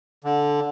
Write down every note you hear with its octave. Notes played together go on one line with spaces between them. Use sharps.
D3